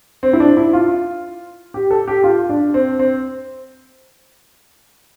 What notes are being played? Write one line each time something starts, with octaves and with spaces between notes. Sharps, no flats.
C4
E4
D4
E4
F4
G4
A4
G4
F4
D4
C4
C4